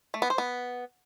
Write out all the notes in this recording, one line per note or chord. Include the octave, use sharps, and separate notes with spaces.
A3
B3
C5
B3